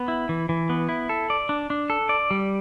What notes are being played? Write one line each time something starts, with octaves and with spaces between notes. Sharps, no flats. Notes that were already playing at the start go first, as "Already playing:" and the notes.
Already playing: B3
E4
E3
E3
B3
E4
A4
D5
D4
D4
A4
D5
G3